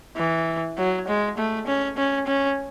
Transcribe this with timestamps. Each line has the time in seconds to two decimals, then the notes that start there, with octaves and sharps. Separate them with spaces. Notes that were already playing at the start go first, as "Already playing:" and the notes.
0.17 E3
0.78 F#3
1.08 G#3
1.38 A3
1.67 C#4
1.97 C#4
2.27 C#4